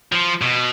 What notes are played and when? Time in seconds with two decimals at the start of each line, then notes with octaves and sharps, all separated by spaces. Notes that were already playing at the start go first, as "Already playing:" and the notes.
0.12 F3
0.41 B2